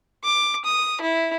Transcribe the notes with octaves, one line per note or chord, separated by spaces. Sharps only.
D6
D#6
E4